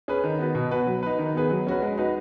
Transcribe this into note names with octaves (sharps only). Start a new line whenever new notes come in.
C#4 G#4 B4
D#3
B3 F#4 B4
B2
B3 F#4 B4
F#3
D#4 B4
D#3
B3 G#4 B4
F#3
C#4 F#4 B4
G#3
D#4 F#4 B4